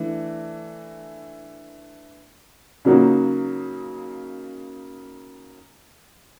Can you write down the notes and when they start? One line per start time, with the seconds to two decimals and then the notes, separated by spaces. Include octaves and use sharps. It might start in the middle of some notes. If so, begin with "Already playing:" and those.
Already playing: E3 A3 D4
2.85 C#3 F#3 A#3 D#4 F#4